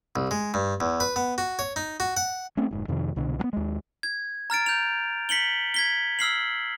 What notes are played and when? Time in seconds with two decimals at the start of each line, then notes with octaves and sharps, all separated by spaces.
0.16 C2
0.31 G#3
0.54 G2
0.80 E2
1.00 B4
1.16 B3
1.38 F#4
1.59 C#5
1.76 D#4
2.00 F#4
2.17 F#5
2.57 A3 A#3 C4 C#4
2.71 F1 G#2
2.88 F2 C3 D#3
3.16 C2 B2 D3
3.39 F#3 B3
3.53 D#2 G#3
4.03 G#6
4.50 A#5 F6 A6 D7
4.66 G6 F7
5.29 B6 C#7 F#7 G7
5.74 G#6 B6 G7
6.19 E6 F6 C7 F#7